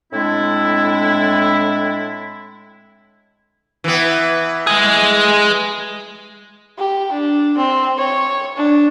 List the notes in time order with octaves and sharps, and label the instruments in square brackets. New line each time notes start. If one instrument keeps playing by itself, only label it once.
[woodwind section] A2 G#3 C4 D4 E4
[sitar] E3 B3
[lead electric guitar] G#3 G#4
[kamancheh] G4
D4
C4
C#5
D4